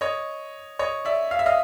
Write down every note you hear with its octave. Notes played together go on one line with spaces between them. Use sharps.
C#5 D#5
C#5 D#5
D5 E5
F5
E5
D#5 F5